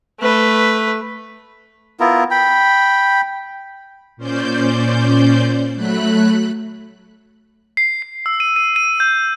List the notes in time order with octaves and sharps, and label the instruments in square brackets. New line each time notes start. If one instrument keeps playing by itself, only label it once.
[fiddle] A3 B4
[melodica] B3 E4 F4 A#4
G5 B5
[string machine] A#2 C#4 C5 D5 G6
F#3 A3 B5 F#6
[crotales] C7
C7
E6
D#7
D#7
D#7
G6